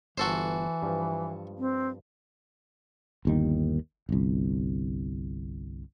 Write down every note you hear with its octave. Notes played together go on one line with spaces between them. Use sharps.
G1 E3 F#4 A4 A#4 C5 A#5
G2 F3
C4
G1 D#2 D#3
G1 C2